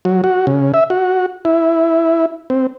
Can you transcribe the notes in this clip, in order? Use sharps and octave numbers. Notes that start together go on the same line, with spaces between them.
F#3
F#4
C#3
E5
F#4
E4
C4